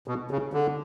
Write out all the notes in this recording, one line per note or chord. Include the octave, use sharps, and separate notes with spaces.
B2
C#3
D3